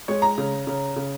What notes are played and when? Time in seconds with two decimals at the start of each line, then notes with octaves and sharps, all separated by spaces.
0.08 G#3 C#5
0.22 A#5
0.38 C#3
0.67 C#3
0.96 C#3